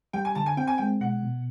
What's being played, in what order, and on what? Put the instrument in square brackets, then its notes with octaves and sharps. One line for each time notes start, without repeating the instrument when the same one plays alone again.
[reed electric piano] G3 [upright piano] G5
[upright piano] G#5
[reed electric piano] D3 [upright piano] A5
[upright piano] G#5
[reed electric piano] C4 [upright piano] G5
[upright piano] G#5
[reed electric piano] G#3 [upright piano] G5
[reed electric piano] B2 [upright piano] F#5
[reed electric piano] B2